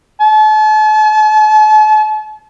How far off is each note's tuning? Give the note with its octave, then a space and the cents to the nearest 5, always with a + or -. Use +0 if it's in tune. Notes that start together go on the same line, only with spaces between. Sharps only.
A5 -40